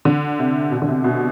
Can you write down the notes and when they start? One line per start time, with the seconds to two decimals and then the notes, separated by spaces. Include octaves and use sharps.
0.05 D3
0.39 C3
0.71 B2
0.82 D3
0.88 C3
1.04 B2